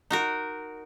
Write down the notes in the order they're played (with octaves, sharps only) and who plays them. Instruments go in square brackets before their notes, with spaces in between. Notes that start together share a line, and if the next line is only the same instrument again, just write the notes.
[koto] D#4 F#4 A#4